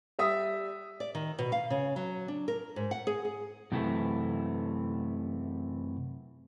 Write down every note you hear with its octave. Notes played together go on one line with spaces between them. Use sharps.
G3 E5 D#6 B6
D5
D#3
B2
F5
C#3
F#3
D4
A#4
G#2
F#5
G#4
G#4
F#2 C3 E3 A3